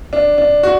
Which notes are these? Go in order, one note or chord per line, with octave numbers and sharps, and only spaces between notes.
D4
D4
F#4